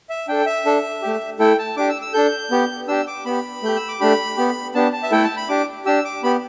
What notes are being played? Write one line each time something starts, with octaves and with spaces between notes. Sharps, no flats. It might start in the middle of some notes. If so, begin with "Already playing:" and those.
E5
D4 A4 G5
E5
D4 A4
A3 G4
A3 E4 A4 G5
A5
D4 G4 D6
E6
E6
D4 A4 G6
B3 G4
D4 G4 E6
D6
B3 G4 B5
A3 G4 G6
E6
D6
A3 D4 G4 B5
B3 G4
B3 D4 G4 A5
A5
E5
A3 E4 A4 G5
A5
B5
D4 G4 D6
D4 G4 E6
D6
B3 G4 B5